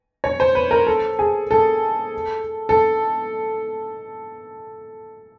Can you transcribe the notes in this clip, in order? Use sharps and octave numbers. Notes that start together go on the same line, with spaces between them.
C#5
C5
B4
A#4
A4
G#4
A4
A4